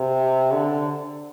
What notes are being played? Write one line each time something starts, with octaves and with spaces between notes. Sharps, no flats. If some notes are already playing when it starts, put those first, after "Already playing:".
Already playing: C3
D3